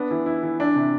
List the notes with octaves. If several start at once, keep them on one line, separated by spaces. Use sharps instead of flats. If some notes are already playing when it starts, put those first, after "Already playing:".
Already playing: B3 D4
E3
E4
E3
D4
C3